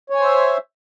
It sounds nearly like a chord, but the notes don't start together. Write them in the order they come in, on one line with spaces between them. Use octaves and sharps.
C#5 G#5 C5 E5